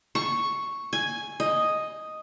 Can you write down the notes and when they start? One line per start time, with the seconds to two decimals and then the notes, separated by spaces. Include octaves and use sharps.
0.15 C#6
0.93 G#5
1.40 D#5